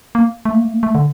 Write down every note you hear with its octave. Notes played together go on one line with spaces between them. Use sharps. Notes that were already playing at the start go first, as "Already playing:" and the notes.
A#3
A3
A#3
A3
A#3
A3
D3